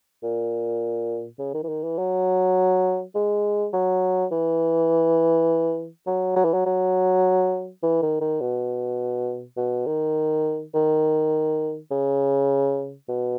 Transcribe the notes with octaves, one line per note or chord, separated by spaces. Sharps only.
A#2
C#3
D#3
E3
D#3
E3
F#3
G#3
F#3
E3
F#3
F#3
E3
F#3
F#3
E3
D#3
D#3
B2
B2
D#3
D#3
C#3
B2